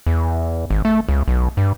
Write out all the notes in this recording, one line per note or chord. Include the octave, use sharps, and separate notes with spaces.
E2
G#1
A3
C#2
B1
G2